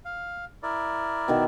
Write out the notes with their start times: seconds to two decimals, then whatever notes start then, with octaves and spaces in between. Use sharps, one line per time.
0.05 F5
0.63 E4 A#4 D5
1.28 B2 D#3